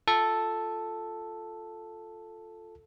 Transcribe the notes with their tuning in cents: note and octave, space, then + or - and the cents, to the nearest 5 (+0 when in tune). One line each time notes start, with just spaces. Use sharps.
F4 +0 A4 +0